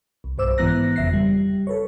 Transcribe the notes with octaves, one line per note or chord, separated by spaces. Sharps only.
C2
B1 G2 C5 D6 E6
G#2 E3 B3 A#5 F#6 A#6
G1 F2 C#3 E5 A#6 C7
G3
A4 B4 C#5